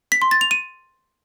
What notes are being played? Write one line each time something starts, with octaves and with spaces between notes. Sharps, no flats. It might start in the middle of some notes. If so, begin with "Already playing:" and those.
B6
C6
A6
F7
D#7